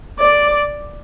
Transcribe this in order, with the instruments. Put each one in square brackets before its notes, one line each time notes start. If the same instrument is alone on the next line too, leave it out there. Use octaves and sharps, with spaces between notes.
[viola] D5